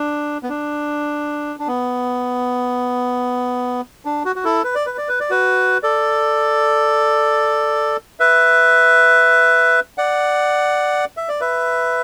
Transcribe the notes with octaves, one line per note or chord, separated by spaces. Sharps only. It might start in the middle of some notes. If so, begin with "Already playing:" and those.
Already playing: D4
B3
D4
D4
B3
D4
F#4
F#4
E4 A4
B4
D5
B4
D5
B4
D5
F#4 B4
A4 D5
B4 E5
D5 F#5
E5
D5
B4 E5